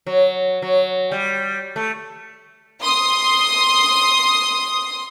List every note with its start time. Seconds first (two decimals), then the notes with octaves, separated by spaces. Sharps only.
0.07 F#3
0.62 F#3
1.11 G3
1.76 A3
2.83 C6 D#6